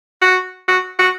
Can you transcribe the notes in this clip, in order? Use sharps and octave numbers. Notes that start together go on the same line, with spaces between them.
F#4
F#4
F#4